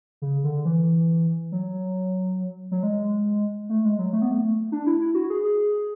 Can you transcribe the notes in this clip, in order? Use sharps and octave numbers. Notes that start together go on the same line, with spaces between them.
C#3
D3
E3
F#3
F#3
G#3
A3
G#3
F#3
A3
B3
A3
D4
E4
E4
F#4
G#4
G#4